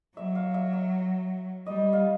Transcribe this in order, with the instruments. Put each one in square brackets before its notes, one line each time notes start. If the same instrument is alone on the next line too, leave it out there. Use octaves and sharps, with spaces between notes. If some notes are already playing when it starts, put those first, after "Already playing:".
[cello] F#3 [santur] E5
[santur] F5
E5
E5
[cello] G3 [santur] D#5
[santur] F5